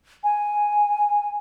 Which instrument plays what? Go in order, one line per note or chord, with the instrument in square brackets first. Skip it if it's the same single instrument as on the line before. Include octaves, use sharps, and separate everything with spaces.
[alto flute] G#5